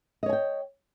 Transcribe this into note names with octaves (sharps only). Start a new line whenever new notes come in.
C#5 D#5 G5 G#5